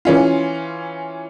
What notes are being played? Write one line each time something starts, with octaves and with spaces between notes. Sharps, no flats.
E3 C#4 F4